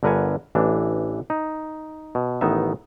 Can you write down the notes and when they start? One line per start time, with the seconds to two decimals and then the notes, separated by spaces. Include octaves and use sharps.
0.03 G1 D3 A#4 B4 F#5 G#5
0.55 A1 E3 D4
1.30 D#4
2.15 B2
2.41 A1 D#3 B3 D#4 E5